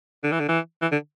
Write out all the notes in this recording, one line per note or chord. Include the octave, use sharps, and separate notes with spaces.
D3
E3
D3
E3
E3
D3